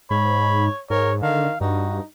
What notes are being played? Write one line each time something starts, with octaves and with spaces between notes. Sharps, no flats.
G#2 C#5 B5
G#2 A#4 C#5
D3 D#3 F5
G2 D#4 F#4